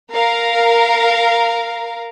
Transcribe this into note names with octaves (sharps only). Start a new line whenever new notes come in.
A#4 F5 A#5